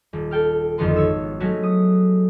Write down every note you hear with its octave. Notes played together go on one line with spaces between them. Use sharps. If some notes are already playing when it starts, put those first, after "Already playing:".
D#1
A4 G5 F6
G#1 F2 D3 D#3 B3 C6
C#5 E6
F#3 G#3 A3 C#4 F#4
D#6